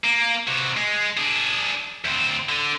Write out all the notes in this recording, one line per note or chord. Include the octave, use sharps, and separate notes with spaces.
A#3
C3 F#4
G#3
D4 G#4
D2 C4
D3